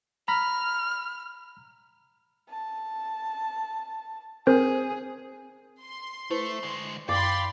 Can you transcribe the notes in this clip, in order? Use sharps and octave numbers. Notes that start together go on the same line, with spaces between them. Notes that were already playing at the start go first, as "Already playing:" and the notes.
A#5 B5 F6
A5
C4 G#4 A#4 C5
C6
A3 E4 A4 B4 C5
D3 G#3
F#2 D5 F5 G5 B5 C6